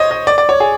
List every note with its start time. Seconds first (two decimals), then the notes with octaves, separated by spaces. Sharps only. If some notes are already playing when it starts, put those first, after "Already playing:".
Already playing: C5 C#5 D#5
0.11 D#5
0.27 D5
0.38 D5
0.49 C#5
0.60 G#4